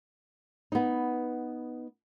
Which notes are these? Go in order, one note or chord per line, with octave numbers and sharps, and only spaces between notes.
B3 D#4